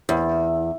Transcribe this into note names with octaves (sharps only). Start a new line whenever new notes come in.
E2